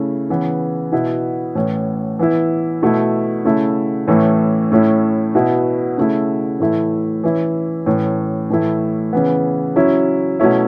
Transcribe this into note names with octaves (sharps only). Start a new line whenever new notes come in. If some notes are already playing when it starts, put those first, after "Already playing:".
Already playing: C#3 A3 E4
C#3 E3 B3
B2 B3 E4
A2 E3 C#4
E3 B3 E4
B2 A3 E4
C#3 A3 E4
A2 E3 A3 C#4 E4
A2 A3 C#4 E4
B2 B3 E4
C#3 A3 E4
A2 E3 A3 E4
E3 C#4 E4
A2 E3 A3 C#4
A2 E3 A3 E4
C#3 E3 B3
C#3 F#3 C#4 E4
B2 F#3 A3 C#4 E4